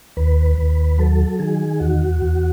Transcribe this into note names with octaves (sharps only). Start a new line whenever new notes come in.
D#2 B4
D#2
F#3 A4
D#3 G#4
E2 F#4
E2